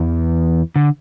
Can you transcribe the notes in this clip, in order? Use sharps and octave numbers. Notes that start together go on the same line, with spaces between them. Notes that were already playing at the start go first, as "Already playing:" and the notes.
Already playing: E2 E3
D3